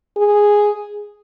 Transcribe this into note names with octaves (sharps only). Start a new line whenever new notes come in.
G#4